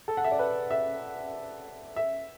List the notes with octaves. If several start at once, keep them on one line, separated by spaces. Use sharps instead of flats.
A4
F#5
E5
D5
B4
E5
E5